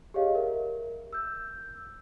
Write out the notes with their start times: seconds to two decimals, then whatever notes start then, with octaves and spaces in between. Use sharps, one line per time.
0.14 G4 G#4 C#5 D#5 F5
0.35 A#4 E5
1.13 E6 G6